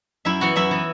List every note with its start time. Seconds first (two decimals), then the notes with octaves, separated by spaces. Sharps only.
0.25 F#2 E4 E5
0.40 E3 B3 F#4 F#5
0.56 F#2 E4 E5
0.71 E3 B3